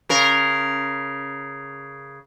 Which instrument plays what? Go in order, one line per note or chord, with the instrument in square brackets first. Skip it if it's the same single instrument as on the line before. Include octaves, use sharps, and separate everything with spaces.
[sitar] C#3 A#4